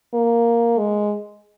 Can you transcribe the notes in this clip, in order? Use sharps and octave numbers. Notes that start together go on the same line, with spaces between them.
A#3
G#3